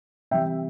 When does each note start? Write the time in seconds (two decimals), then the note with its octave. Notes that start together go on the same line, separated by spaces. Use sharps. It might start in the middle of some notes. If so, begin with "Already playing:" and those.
0.31 C3 E3 G3 E5 G5